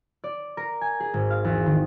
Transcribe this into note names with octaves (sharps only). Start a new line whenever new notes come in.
D5
A#4
G#5
G#4
G#1
F5
E2
D#3